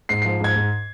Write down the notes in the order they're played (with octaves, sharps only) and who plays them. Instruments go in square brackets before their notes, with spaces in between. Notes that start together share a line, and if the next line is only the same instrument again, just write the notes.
[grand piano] G#2 C7
C7
F3
G#2 G#6
G#2